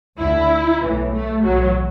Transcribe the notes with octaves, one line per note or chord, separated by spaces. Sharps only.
D2 D3 E4
B1 A2 E3
A3
B1 A2 E3 F#3